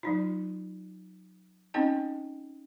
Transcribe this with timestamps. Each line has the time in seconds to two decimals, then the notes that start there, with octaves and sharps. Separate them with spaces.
0.03 F#3 D#4 F4
1.74 C4 C#4 D#4 D#5 G5 A5